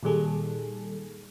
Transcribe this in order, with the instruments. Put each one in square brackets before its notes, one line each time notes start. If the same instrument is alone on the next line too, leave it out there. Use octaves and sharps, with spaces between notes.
[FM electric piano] A#2 D#3 G3 G#4 A4